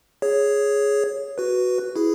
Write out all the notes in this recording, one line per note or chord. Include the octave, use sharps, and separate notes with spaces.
G#4 C#5
F#4 B4
E4 G#4